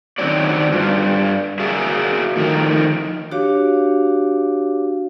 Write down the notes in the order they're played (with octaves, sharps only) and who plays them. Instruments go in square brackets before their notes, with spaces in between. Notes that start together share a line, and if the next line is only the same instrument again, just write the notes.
[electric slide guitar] D#3 F#3 C4 D4 F#4 D5
G2 F4
F#4 G#4 A#4 E5 F5 G#5
A2 D#3 F3 A#4
[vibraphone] D4 F#4 G4 C#5 F5 D6